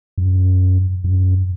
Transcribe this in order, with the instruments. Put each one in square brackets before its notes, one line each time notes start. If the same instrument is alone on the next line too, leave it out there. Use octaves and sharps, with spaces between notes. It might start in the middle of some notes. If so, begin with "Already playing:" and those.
[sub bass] F#2
F#2